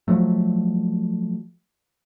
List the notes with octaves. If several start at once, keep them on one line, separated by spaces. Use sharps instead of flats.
F3 F#3 A3